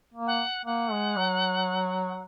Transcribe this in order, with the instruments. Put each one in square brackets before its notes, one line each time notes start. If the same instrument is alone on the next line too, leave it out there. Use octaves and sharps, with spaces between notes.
[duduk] A#3
[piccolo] F#5
[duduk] A#3 [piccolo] F#5
[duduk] G#3
F#3